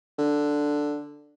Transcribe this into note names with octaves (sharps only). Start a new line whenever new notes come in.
D3